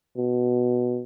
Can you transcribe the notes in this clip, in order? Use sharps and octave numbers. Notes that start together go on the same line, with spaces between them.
B2